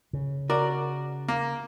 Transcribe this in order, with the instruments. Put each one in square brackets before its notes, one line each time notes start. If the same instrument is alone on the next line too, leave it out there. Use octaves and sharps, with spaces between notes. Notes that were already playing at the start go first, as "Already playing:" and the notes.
[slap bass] C#3
[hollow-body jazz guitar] F#4 A#4 [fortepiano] D5
[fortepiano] A#3